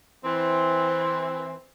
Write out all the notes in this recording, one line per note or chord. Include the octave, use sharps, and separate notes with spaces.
E3 C4